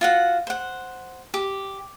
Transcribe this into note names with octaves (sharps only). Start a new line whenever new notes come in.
F4 F#4 F#5
C5 F#5
G4